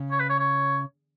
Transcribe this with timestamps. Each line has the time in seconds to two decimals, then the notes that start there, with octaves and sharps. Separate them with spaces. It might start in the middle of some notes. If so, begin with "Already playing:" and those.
Already playing: C#3
0.11 C#5
0.20 B4
0.30 C#5
0.40 C#5